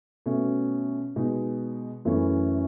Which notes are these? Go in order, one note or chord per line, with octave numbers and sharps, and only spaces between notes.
B2 A3 C#4
B2 G#3 D#4
F#2 E3 A3 C#4